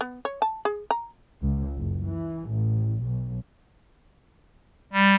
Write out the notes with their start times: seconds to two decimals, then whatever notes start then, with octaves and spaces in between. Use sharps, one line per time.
0.01 B3
0.25 C#5
0.42 A5
0.65 G#4
0.91 A#5
1.42 C#2
1.78 F#1
2.07 E3
2.50 A1
3.05 B1
4.93 G3